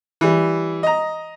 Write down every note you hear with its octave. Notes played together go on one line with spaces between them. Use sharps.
E3 G3
D#5 A#5